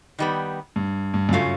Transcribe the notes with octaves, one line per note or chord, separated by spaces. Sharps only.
D#3 G3 B3
G2
G2
F#2
C#3 F#3 A3 C#4 F4